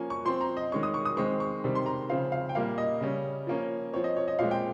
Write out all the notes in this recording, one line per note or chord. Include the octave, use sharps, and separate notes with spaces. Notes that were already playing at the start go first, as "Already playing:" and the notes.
Already playing: F3 A#3 C#4 G#5
C#6
F3 C4 C6
A#5
D#5
D#3 G#3 C#4 C#6
D#6
C#6
D#6
D#3 G#3 C4 C#6
C#6
C3 D#3 G3 C4
C6
A#5
C#3 F3 C4 F5
F5
G5
A#2 G3 A#3 F5
D#5
C#3 G3 C#4
F3 A#3 C#4
F3 C4 C#5
D#5
C#5
D#5
A#2 F3 G#3 C4 F5
G5